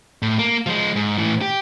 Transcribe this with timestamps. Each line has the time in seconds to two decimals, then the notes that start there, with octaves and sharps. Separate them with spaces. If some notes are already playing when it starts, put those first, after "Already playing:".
0.22 A2
0.39 A#3
0.67 F3 G#3
0.96 G#2
1.18 A2 E3
1.41 G4